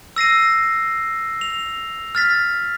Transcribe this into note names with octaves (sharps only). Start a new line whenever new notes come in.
E6 A#6 C7 D#7
F7
F6 A6 B6